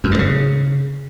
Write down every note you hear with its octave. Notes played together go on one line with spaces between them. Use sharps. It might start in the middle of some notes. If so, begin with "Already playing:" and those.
F#2
G2
C#3